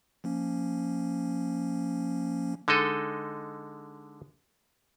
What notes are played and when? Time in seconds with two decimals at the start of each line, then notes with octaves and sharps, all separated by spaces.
0.24 F3 A#3 C#4
2.68 D3 G#3 D#4 A4 D#5